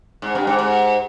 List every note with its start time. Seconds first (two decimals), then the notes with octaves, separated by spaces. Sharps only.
0.22 G#2
0.35 G2
0.47 G#2
0.59 G#2